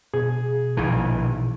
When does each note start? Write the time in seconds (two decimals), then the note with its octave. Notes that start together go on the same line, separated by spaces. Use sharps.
0.14 B2 G#4
0.77 A#1 D#3 E3